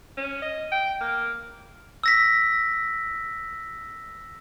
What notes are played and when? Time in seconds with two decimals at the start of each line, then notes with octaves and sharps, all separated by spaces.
0.17 C#4
0.42 D#5
0.72 G5
1.00 A#3
2.04 E6 A#6 B6